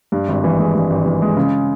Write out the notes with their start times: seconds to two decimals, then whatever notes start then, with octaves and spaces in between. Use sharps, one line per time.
0.12 G2
0.28 G#1
0.44 E3
0.58 G#3
0.75 G2
0.90 G#1
1.06 E3
1.22 G#3
1.36 C#3